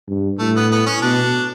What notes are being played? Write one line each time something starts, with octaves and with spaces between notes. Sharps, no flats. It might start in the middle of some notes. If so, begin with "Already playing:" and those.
G2
A2 A3
B3
B3
C#4
B2 D4